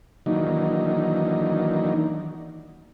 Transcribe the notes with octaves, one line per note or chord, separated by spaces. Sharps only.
D#3 E3 F#3 A#3 D4 D#4